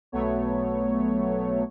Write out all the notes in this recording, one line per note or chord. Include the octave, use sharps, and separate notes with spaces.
B1 F#3 A3 B3 C#5